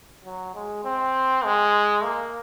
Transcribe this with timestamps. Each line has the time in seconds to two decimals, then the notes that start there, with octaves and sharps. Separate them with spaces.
0.25 F#3
0.55 G#3
0.85 C4
1.44 G#3
2.04 A#3